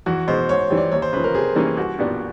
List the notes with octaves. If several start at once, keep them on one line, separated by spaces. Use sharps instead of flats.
E2 F#4
B2 G#3 C5
G#2 C#5
E3 G3
D5
D#2 C#5
C5
C#3 F3 B4
A#4
C3 G#4
E3 G3 A#3 C#4
C2 F#4
A#2 G3 B3 D4